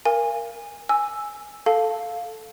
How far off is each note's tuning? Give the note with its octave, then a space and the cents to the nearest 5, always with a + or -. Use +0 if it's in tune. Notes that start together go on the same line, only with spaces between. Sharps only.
A#4 +5 F5 -30 G#5 -20
G#5 +0 E6 +0
A4 +0 F5 +0 A5 +0